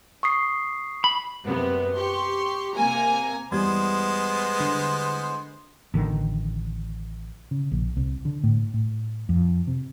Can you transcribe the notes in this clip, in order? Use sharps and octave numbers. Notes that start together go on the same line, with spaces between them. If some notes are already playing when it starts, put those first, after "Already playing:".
C#6 D#6 C7
B5
F#2 C3 B3
G4 C6 C#6
C3 A#3 G#5 A#5
E2 G3 G#3 B3 C5 G#6
D3
A1 D3 D#3
C#3
A#1
C2
D3
A2
A2
F2
C3